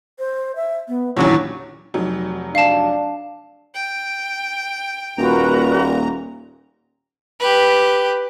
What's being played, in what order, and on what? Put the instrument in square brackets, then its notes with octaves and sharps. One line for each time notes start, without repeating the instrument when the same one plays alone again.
[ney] C5
E5
B3
[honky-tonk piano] A1 D#2 A#2 [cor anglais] F#3 [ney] C#4 [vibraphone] D4 E4
[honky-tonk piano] F1 F#3 D#4
[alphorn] D4 [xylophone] F5 A5
[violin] G5
[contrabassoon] D#1 [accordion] A#2 A#5 [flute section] F#4 A#4 B4
[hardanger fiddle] G4 B4